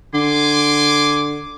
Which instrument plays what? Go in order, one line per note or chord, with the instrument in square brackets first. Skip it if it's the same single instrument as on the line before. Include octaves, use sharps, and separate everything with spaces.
[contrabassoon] D3 [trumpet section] G#5 C6 D6